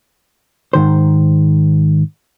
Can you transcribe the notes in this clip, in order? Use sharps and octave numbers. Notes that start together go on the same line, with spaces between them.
G#2 D#3 C5